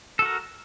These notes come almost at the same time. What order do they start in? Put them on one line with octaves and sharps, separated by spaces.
A4 F#4 A#4